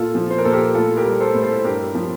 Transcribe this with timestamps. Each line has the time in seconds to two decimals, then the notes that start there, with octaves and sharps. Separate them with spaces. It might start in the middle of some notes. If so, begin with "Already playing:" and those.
Already playing: A#2 F4 A4
0.15 F3
0.30 C5
0.38 A#4
0.45 A#2 A4
0.52 G4 A#4
0.75 A2 F4 A4
0.97 G4 A#4
1.06 G3
1.20 A4 C5
1.34 A2
1.42 A4 C5
1.64 G2 G4 A#4
1.95 F3